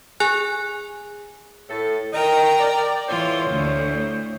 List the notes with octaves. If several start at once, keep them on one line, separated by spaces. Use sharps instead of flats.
G#4 G#5 F#6
A2 A4
D#3 A#4 D#5 G5 A#5
D5
A2 E3 F4 C5 C#5
D2